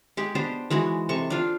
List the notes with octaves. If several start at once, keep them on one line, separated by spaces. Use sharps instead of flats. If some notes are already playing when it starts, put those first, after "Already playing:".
G#3 D#4 G4
B3 D4 G4 C5
E3 G#3 D#4 F#4
C3 A4 C#6
D4 F4